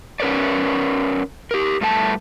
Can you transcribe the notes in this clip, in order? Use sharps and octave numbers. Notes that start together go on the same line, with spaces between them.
C#4 A#4 B4 C#5 D5
G4 A#4
G2 A3 G#4 A5